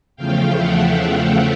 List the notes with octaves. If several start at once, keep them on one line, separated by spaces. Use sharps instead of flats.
E2 C#3 F3 A3 F5 G5
E5 F#5
F5 G5